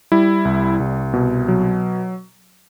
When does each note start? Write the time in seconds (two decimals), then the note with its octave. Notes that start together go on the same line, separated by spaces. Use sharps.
0.12 G3 E4
0.45 C2
0.80 C2
1.14 B2
1.48 F#3